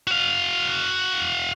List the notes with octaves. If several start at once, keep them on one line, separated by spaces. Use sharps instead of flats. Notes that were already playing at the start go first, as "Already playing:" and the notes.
F#4 F5